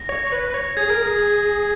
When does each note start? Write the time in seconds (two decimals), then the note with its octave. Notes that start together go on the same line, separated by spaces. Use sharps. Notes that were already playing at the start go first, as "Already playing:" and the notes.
Already playing: A#6
0.09 C#5
0.27 C#5
0.32 B4
0.50 B4
0.54 C#5
0.77 G#4 G#6
0.90 A#4
1.02 G#4